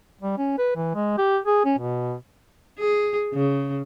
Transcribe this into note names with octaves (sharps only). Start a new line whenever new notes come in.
G3
C#4
B4
E3
G#3
G4
G#4
C#4
B2
G#4
C#3